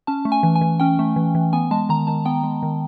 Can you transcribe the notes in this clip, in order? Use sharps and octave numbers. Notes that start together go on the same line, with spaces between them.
C#4 A5
A3
G#5
E3
G#5
E3
C#4 G5
A3
E3
E3
B3 G#5
G#3 A5
D#3 A#5
D#3 A5
B3 G5
G#3
D#3